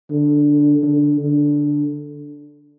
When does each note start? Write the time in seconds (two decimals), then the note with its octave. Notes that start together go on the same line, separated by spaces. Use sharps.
0.10 D3
0.83 D3
1.19 D3